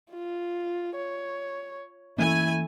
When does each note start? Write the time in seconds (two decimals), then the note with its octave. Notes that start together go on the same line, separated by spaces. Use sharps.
0.12 F4
0.96 C#5
2.18 E3 A3 A#3 C#4 E4 G#5